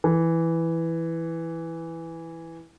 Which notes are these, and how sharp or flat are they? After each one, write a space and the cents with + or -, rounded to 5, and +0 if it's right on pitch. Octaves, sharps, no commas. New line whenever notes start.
E3 +0